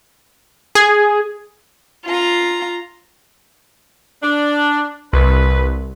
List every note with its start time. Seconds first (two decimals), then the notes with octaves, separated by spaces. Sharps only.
0.75 G#4
2.06 F4 A#5
4.23 D4
5.13 C2 B4